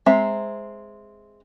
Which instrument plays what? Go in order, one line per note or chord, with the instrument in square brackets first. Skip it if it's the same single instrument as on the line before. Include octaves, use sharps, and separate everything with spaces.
[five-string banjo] G#3 C4 E5 A#5